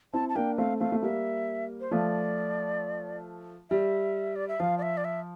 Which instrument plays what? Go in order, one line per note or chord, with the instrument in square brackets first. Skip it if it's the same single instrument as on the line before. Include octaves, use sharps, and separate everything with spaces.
[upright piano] C4 E4 [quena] A5
[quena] A5
[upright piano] A#3 D4 [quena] G5
[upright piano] A3 C4 [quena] F5
[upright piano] A3 C4 [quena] F5
[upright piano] A3
[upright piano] G3 A#3 [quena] E5
[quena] C5
[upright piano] F3 A3 [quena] D5
[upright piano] G3 [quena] E5
[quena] D5
E5
[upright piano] F3 [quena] F5
[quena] D5
E5
D5
E5